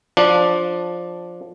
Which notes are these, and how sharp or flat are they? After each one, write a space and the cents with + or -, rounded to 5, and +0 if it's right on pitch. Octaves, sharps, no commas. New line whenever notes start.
F3 +10 D4 +0